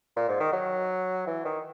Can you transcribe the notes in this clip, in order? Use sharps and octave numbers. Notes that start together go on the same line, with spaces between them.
A#2
G#2
D#3
F#3
E3
D#3